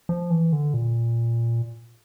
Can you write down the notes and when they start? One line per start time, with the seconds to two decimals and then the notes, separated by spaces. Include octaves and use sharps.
0.09 F3
0.30 E3
0.52 D3
0.74 A#2